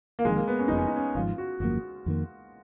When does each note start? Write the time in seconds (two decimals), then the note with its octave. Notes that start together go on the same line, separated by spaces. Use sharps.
0.19 A#3
0.25 F1 F2 D#3 G#3
0.36 A#3
0.48 B3
0.59 C#4
0.68 F#1 F2 C#3 F3 D#4
0.78 C#4
0.87 D#4
0.96 C#4
1.15 G#1 G#2 F3 F4
1.38 F#4
1.60 G#1 F#2 F3 A#3 F#4
2.06 F2 D#3 A#3